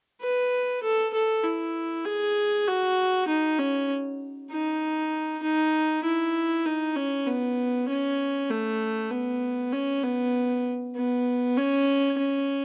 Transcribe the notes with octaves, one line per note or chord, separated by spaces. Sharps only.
B4
A4
A4
E4
G#4
F#4
D#4
C#4
D#4
D#4
E4
D#4
C#4
B3
C#4
A3
B3
C#4
B3
B3
C#4
C#4